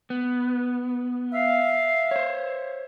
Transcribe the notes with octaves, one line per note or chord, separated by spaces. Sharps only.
B3
E5 F5
C5 C#5